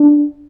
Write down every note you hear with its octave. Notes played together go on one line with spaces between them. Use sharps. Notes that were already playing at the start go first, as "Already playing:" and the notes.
Already playing: D4